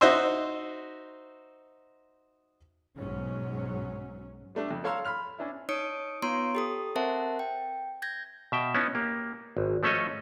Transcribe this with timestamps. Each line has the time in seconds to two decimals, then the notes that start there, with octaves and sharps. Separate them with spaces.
0.01 D#4 F#4 C5 D#5 E5 C6
2.98 B1 G#2 F#3 C#4
4.55 G3 A3 D4
4.71 F2
4.84 A4 C#5 F5 A#5 C6 E6
5.05 B5 C6 F6 F7
5.39 C#4 D4 E4
5.69 D#4 C#5 D#6 C#7 D7
6.22 B3 F4 C#5 A#5 C6 D7
6.55 G4 A4 D#6
6.96 C4 A#4 C5 E5 F#5 A5
7.39 G5
8.02 G6 G#6 A#6
8.52 B2 E5 G5
8.74 B3 C#4 D#4 E4
8.95 A#3 G4
9.57 G#1
9.83 F3 A3 C#4 A4 C#5 D#5